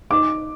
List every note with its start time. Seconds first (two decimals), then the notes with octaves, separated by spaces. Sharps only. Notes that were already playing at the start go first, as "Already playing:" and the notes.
0.10 D#4 D6